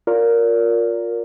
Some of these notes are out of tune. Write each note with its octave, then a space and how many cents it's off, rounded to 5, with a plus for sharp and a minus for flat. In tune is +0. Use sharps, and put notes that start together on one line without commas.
F4 +20 A#4 +0 D5 -35